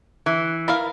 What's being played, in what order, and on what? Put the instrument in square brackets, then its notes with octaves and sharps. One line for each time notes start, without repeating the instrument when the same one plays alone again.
[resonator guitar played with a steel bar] E3
[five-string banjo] E4 A#4 F5